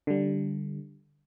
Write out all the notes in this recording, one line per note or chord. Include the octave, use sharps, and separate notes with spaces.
D3 G3